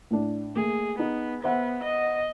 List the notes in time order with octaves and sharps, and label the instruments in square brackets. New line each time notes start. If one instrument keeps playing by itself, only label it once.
[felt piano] A2 D4
[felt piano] A3 A#3 [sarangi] G#4
[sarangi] B3 [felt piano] D#4
[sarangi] B3 [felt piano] C5 E5 F#5
[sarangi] D#5